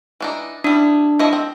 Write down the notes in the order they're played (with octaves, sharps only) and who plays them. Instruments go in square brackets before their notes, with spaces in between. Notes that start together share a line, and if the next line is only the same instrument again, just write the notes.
[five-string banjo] E3 D4 D#4
[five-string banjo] G3 E4 [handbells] D4
[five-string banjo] F3 E4 D#5
C4